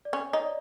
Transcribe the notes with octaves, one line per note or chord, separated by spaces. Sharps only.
D5
C#4 C#5
D#4 D#5
D5